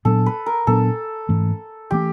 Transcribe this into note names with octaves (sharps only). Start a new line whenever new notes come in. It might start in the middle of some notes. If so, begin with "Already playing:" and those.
A#2 F#3 B3 D4 A4
B4
A#4
A#2 F#3 B3 D4 A4
G#2 E3 A3 C#4
E3 A3 C#4 G4